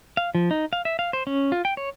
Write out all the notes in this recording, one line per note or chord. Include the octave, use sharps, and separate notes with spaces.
F5
F3
D#4
F5
E5
F5
C5
C#4
F4
G5
C#5